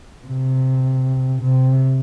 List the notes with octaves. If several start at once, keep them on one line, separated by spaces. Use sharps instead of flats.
C3
C3